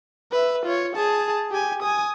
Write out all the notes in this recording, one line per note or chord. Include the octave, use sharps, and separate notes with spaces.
B4 E5
F4 C#5
G#4 A5
G4 G#5
G#5 D#6